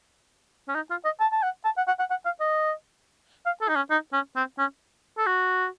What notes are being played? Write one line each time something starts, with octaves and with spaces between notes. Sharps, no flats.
C#4
D#4
F4
D#5
A5
A5
F#5
A5
F#5
F#5
F#5
F#5
F5
D#5
F5
A4
D#4
C#4
D#4
C#4
C4
C#4
A4
F#4